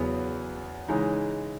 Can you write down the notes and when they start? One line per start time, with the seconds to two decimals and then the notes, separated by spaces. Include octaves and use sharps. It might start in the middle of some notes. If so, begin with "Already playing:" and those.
Already playing: E2 C#3 F#3 B3
0.89 C#3 E3 G#3 D#4